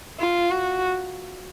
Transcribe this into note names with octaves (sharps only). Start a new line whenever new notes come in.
F4
F#4